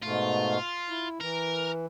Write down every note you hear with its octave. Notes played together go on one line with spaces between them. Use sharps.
G#2 B2 A3 F4
E4
E3 A#4